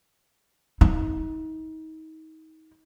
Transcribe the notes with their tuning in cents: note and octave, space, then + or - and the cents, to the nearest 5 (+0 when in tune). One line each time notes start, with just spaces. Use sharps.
D#4 +30